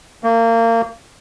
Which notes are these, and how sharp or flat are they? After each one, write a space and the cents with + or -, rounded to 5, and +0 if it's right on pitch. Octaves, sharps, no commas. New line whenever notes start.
A#3 -30